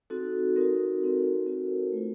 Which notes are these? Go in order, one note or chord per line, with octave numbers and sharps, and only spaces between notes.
C4 D#4 F#4 A4
C4 D#4 F#4 A#4
C4 D#4 F#4
C4 D#4 F#4 C5
A3 C4 F4